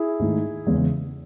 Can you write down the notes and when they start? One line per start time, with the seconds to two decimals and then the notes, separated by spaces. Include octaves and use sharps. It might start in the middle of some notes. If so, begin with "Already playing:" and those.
Already playing: E4 G#4
0.19 G#2 D#3 A3
0.66 E2 C#3 G#3